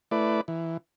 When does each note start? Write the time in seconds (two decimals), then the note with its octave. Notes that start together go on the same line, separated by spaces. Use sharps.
0.11 A3 E4 B4 D5
0.48 E3